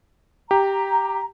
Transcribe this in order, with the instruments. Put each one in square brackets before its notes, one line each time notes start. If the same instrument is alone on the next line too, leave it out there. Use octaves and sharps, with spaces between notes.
[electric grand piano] G4 [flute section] A#5